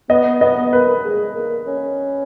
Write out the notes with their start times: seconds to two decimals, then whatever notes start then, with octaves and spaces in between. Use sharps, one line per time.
0.09 B3 D#5
0.41 B3 D#5
0.73 A#3 B4
1.04 G#3
1.35 A#3
1.67 C#4